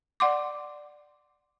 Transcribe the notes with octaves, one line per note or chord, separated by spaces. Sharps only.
D5 F#5 C6 D6